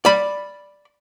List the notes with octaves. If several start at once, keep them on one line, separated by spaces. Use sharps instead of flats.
D5 B5